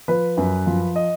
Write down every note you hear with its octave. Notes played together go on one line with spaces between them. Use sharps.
F3 B4
F#2
F3
D#5